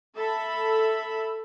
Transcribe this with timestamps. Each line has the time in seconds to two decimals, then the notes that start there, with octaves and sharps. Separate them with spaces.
0.16 A4 E5 B5